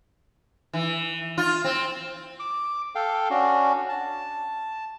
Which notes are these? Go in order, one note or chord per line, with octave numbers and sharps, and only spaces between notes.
E3
F4
C4
D6
A4 F5 G5
C#4 D4 F#4
A5